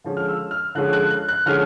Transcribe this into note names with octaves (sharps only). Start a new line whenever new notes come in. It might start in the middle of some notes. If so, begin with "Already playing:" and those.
D3 F3 G#3 C#4
F6
E6
F6
D3 F3 G#3 C#4 F#6
F#6
F#6
F#6
D3 F3 G#3 C#4 F6